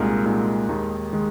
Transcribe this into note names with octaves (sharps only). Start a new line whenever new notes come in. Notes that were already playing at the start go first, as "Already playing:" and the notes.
Already playing: C2 A#2 G#3 D#4 A#4
C2 A#2 G#3 D#4 A#4
D#2 D#3 G#3 D#4
D#3 G#3 D#4